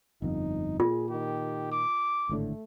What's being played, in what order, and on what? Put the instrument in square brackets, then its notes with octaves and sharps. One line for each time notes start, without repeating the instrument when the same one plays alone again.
[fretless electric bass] G1 F2 [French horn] D#4
[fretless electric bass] A#2 [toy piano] F4 [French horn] G#4
[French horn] D#3 [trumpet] G4
[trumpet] D6
[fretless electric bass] G#1 A2 D3 [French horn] A3